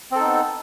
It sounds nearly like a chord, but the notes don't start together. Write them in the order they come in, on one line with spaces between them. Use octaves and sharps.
C4 A4 D#4 B3